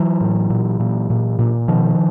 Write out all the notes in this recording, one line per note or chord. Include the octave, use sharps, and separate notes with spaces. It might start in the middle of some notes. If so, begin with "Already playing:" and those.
Already playing: E3 F#3
A2
A#2
A#2
A#2
A#2
B2 D#3 F3